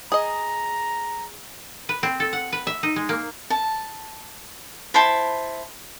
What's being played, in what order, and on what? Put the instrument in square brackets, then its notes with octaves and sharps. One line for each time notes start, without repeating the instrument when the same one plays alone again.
[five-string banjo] G#4 D#5 [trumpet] A#5
[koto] B4
C4
A4
F#5
B4
E5
D#4
G#3
A#3
[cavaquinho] A5
E4 C5 A5 B5